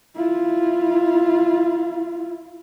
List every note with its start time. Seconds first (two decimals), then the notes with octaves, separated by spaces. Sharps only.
0.16 E4 F4